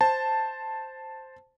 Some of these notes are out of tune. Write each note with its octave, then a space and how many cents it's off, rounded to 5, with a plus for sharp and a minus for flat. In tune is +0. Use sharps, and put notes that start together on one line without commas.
C5 +0 A5 +0